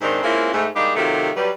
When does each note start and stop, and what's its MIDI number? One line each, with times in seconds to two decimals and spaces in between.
0.01 0.22 44
0.01 0.22 48
0.01 0.22 51
0.01 0.22 60
0.01 0.22 62
0.23 0.51 56
0.23 0.51 58
0.23 0.51 60
0.23 0.51 61
0.23 0.51 64
0.23 0.51 65
0.53 0.66 44
0.53 0.66 57
0.75 0.94 55
0.75 0.94 56
0.75 0.94 58
0.75 0.94 62
0.75 0.94 63
0.96 1.29 48
0.96 1.29 51
0.96 1.29 54
0.96 1.29 57
0.96 1.29 65
0.96 1.29 67
1.36 1.50 54
1.36 1.50 55
1.36 1.50 71